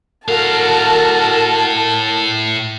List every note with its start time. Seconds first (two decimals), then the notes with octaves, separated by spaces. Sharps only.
0.28 A2 F#4 A4 A#4 F5 A5